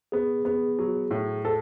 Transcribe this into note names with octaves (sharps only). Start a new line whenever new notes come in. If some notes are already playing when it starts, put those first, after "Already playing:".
B3 G#4
B3 G#4
F#3
A2
A4